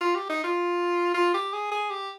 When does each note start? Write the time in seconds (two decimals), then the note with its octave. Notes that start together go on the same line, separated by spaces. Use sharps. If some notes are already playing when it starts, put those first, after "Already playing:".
0.01 F4
0.15 G4
0.29 D#4
0.44 F4
1.14 F4
1.34 G4
1.53 G#4
1.71 G#4
1.90 G4